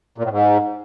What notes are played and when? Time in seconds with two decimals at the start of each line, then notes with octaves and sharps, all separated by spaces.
0.18 A#2
0.24 A2
0.31 G#2